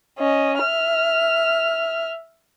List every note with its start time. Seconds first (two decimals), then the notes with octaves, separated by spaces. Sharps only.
0.19 C#4 D#5
0.60 E5 F6